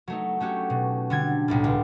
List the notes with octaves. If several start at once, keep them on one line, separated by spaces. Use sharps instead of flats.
F#3 A3 D#4
A3 C#4 F#4 G4
B2
D3 G3 G#6
B1 A2 G3
C#2